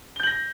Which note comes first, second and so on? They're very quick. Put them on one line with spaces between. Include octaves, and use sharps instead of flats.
G7 G6 F#7 A#6